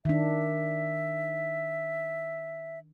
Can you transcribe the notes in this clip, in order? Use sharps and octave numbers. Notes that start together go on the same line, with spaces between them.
D#3 D4 E5